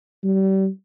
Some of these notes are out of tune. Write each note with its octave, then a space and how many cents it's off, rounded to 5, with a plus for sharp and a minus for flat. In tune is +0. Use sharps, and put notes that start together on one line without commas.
G3 -30